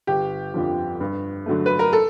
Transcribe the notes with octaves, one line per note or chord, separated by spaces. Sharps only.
G1 G4
F2 D3 F3
G2
D3 F#3 A3
B4
A#4
A4